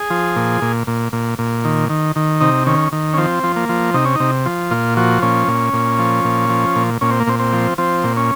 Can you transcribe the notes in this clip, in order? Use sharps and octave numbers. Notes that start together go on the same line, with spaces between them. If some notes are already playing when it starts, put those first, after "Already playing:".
Already playing: G#4
F3
A#2
A#2
A#2
A#2
A#2
D#3
D#3
D#3
C3 D#4
D#3 C#4
D#3
C#4
F3 C4
F3
A#3
F3
C3 D#4
C#4
C3 D#4
F3
A#2 F4
F3 F#4
A#2 C#4
A#2
A#2
F3
A#2
F3
A#2
A#2 C#4
C4
A#3
A#2 C4
C4
F3
F3 C4
A#2
C#4